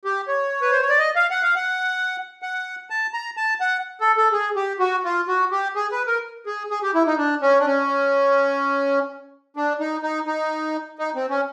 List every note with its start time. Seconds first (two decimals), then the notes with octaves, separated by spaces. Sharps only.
0.05 G4
0.28 C#5
0.62 B4
0.72 C5
0.81 C#5
0.89 D5
0.99 D#5
1.16 F5
1.30 F#5
1.43 F5
1.55 F#5
2.42 F#5
2.90 A5
3.14 A#5
3.37 A5
3.60 F#5
4.01 A4
4.17 A4
4.32 G#4
4.56 G4
4.79 F#4
5.04 F4
5.28 F#4
5.51 G4
5.75 G#4
5.92 B4
6.07 A#4
6.46 G#4
6.70 G#4
6.83 G4
6.95 E4
7.07 D#4
7.18 D4
7.42 C#4
7.60 D4
7.66 C#4
9.57 D4
9.80 D#4
10.03 D#4
10.27 D#4
10.99 D#4
11.15 C4
11.30 C#4